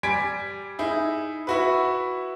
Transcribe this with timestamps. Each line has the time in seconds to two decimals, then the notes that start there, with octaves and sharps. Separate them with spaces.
0.03 G3 G#5 G#6 B6 D7
0.79 D#4 E4 G#4
1.47 E4 F#4 B4